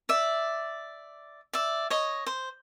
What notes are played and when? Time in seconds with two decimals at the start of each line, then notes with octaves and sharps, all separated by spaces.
0.09 D5 E5
1.53 D5 E5
1.90 C#5 D#5
2.26 C5